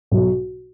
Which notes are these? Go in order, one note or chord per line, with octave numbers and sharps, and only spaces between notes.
B1